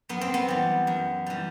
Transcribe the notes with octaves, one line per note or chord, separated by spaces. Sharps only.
F#2 B3
C4
B3
E3 G3
F#2
E3 G3